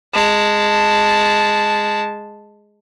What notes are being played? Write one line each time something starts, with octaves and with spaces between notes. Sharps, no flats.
G#3 A5